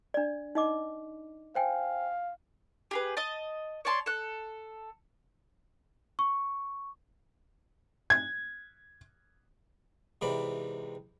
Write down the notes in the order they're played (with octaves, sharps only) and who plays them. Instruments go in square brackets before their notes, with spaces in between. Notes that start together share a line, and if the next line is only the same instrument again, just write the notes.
[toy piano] D4 D5
D#4 D#5 D6
[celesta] C5 G5 G#5 [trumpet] F5
[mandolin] G4 G#4 B4
D#5 A5
C#5 D5 A5 C6
A4 F#6
[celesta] C#6
[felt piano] G#6
[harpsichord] G#2 C3 E3 D5 B5